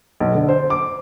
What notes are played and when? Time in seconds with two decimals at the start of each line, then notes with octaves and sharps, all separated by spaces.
0.20 B1
0.35 D3
0.49 C5
0.70 D6